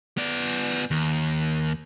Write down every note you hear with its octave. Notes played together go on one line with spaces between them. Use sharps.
B3 D5
D#2